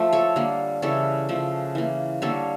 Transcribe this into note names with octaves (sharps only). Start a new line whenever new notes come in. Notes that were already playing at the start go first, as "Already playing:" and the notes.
Already playing: F3 A3
A4 C#5
D3 G3 A#3
C#3 E3 G3 A4 C#5
C#3 F3 A3
E3 A#3
D3 G3 A#3 A4 C#5